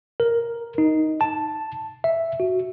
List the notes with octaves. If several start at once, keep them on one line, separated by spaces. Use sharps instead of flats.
A#4
D#4
A5
E5
F#4